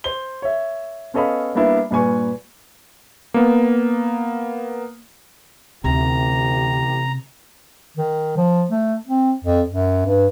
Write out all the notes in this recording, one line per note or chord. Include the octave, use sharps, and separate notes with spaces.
C5 G7
C#5 E5
B3 C#4 A4 D#5 F5 B5
G3 A#3 B3 D4 E4
G2 A#2 B4 G#5 C#6
A#3 B3
A1 D2 C3 D#3 G4 A#5
D#3
F3
A3
C4
F2
F#2
G2